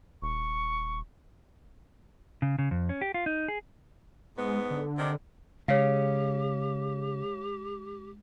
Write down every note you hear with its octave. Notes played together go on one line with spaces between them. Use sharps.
D#1 C#6
C#3
C#3
F2
C#4
G4
F4
D#4
G#4
G#2 G#3 B3
D3
C3 D#3 D4
C#3 G#3 G4 C#5 F5